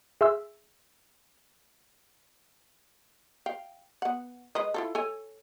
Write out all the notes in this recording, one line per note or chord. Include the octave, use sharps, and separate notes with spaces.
G#4 E5 C6 E6
F5 G5
B3 F#5
G#3 B4 D#5
E4 F4 A4
A4 C#5 G#5